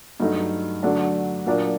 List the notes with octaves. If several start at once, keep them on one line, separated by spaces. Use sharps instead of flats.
G2 F#3 A3 D#4
D3 F#3 A3 D4
A#2 F#3 A#3 D4